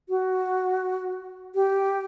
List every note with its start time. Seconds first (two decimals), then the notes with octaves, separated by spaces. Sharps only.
0.09 F#4
1.55 G4